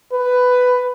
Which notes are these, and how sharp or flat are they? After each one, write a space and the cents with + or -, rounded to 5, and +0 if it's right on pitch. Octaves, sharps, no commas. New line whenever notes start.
B4 +10